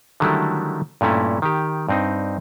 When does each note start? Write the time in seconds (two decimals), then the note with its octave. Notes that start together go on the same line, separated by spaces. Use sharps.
0.20 D3 D#3 F#3 G3 A3 E4
1.01 G2 A#2 A3 C#4 E4
1.42 D#3 G4
1.89 G2 C4 D#4